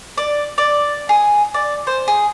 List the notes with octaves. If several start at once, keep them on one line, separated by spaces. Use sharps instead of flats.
D5
D5
G#4
D5
C5
G#4